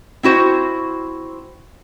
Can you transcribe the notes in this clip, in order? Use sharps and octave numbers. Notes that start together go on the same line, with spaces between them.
C4 E4 F#4 C5